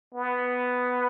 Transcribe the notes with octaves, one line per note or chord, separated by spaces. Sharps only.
B3